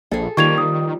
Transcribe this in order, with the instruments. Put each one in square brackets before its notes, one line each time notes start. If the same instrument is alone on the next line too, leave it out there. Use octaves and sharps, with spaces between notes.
[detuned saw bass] A#1 [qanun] G#4 A4
[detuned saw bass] D#3 [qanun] F3 G3 A#3 [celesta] C#6 G#6 F7
[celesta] D#6